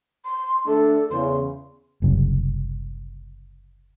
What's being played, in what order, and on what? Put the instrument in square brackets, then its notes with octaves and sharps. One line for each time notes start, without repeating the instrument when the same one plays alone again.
[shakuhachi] C6
[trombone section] D3 A3 D4 [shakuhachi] A4
[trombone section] E2 C#3 [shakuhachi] C6
[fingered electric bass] F#1 C2 F#2 C#3